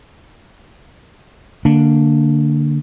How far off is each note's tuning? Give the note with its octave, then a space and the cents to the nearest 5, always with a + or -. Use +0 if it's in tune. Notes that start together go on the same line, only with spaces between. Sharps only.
D3 +0 A#3 -25 D4 +0